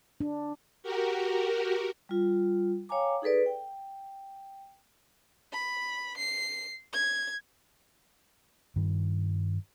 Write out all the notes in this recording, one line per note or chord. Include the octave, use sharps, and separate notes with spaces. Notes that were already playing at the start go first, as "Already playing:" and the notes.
D4
F#4 G4 A#4
G3 F4
C#5 F5 G5 G#5 A#5 D6
D#4 G#4 A4 B4 D5
G5
B5
C7
G#6
G2 D#3 G3